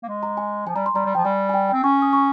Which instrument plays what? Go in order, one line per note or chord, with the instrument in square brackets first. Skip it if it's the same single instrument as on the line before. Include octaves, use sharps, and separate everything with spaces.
[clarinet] A#3
G#3
[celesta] A#5
G#5
[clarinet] F3 [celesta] G#5
[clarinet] G3 [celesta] A#5
[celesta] C6
[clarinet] G3 [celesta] A#5
[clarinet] G3
[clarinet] F3 [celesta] G5
[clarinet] G3 [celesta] G#5
[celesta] G#5
G5
[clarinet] C4 [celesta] G5
[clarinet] C#4 [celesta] C#6
[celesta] D#6
C#6